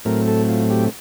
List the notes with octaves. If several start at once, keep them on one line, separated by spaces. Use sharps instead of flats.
A2 F#3 A3 C4 A#4
A4
F4
G4